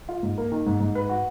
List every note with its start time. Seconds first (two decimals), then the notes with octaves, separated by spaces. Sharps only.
0.09 F4
0.23 G#2
0.38 A#3
0.52 D#3
0.66 G#2
0.80 G#2
0.95 B4
1.09 F#4